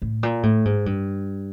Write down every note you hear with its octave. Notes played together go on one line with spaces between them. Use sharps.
A2
A#2
A2
G#2
G2